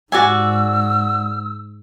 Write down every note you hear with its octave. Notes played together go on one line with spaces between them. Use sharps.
G#2 F#4 D5 G#5 E6